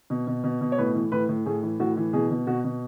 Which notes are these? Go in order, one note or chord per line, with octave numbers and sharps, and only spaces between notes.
B2
B2
B2
B2
C#5
A2 B4
E3
A2 B4
A2
A2 G#4
E3
A2 F#4
E3
B2 G#4
B2
B2 F#4
B2